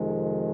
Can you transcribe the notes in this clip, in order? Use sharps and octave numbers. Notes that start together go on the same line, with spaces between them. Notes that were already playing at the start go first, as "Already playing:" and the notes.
Already playing: F2 C3 D#3 G#3